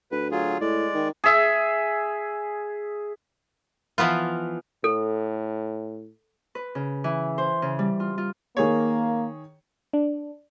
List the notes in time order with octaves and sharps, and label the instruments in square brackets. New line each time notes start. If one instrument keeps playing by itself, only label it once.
[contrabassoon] D2 [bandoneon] B4
[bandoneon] F#3 F4 G#4
[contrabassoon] A2 [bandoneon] G#3 D5
[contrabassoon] D#3
[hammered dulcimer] G#4 E5
[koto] E3 F3 B3 F4
[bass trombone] A2 [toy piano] A4
[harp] B4
C#3
E3
C5
C#3
G3
F4
F4
[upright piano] D#3 G#4 C#5 [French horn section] A#3
[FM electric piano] D4